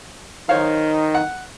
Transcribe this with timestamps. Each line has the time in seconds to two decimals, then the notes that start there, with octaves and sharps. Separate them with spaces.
0.49 D#3 D#4 C5 C#5 F5
1.15 F#5